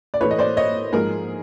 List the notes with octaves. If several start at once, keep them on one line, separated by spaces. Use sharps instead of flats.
D5
A2 E3 A3 B4 C#5
D#5
C5 D5
C#5 D#5
G#2 F3 G#3 G#4 A#4